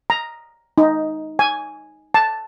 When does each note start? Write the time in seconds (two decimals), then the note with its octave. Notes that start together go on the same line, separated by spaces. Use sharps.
0.10 A#5
0.78 D#4
1.39 G#5
2.14 A5